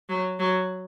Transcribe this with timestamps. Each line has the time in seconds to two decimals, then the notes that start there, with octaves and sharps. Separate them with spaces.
0.09 F#3
0.39 F#3